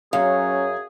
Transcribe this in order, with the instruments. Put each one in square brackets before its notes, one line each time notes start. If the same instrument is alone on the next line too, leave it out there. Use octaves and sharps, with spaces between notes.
[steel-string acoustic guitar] F#2 [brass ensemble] F#3 C#4 [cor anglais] G#4 [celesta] F5